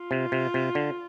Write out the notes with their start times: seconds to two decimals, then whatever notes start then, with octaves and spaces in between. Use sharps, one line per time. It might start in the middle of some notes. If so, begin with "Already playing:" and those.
Already playing: F4
0.11 C3
0.32 C3
0.54 C3
0.75 D3